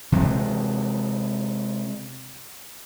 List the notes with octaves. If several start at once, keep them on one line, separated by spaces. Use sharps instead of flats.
C3 E3 G#3